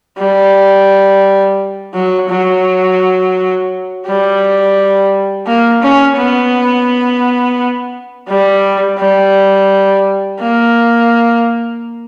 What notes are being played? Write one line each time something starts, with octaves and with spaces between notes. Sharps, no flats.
G3
F#3
F#3
G3
A#3
C#4
B3
G3
G3
A#3